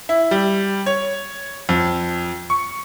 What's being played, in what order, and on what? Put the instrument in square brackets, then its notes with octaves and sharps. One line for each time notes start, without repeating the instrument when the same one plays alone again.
[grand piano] E4
G3
C#5
F2
C#6